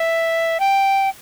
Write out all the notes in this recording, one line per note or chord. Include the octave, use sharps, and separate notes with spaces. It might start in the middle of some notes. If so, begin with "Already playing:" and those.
Already playing: E5
G5